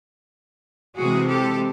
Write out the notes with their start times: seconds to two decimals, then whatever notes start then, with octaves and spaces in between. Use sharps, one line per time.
0.98 C3 E3 G#3 C4 F#4 G#4
1.28 G4 A4